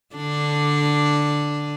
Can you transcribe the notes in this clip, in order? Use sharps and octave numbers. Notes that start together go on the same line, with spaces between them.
D3 D4